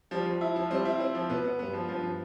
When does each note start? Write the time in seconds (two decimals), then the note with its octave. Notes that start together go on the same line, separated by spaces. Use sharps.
0.11 F3 G3
0.26 F3
0.41 E4
0.56 F3
0.71 G3 C4
0.85 E4
1.00 C4
1.15 F3
1.30 B2 B3
1.45 B3
1.59 G2 B3
1.73 F3
1.89 G2 F3
2.03 F3